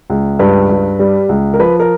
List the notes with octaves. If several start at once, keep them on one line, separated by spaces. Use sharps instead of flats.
C#2
G2 B4
G2
G3
C#2
A#4
F3 B4
A#4